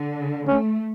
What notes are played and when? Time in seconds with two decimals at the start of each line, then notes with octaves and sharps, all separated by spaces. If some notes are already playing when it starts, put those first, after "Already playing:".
Already playing: D3
0.47 A3 C#4